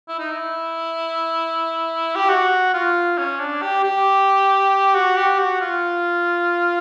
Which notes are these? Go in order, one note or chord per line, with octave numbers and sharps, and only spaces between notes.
E4
D#4
E4
G4
F#4
F4
C#4
D4
G4
G4
F#4
G4
F#4
F4